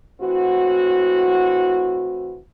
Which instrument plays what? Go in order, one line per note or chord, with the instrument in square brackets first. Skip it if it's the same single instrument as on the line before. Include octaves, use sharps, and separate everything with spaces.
[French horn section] A2 E3 C4 F#4